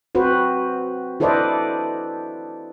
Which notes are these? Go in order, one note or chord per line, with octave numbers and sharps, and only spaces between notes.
C4 F#4 B4 C5
E4 A4 B4 C5 D5 D#5